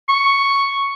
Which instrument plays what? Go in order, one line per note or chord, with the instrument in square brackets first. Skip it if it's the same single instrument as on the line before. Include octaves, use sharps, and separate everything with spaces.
[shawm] C#6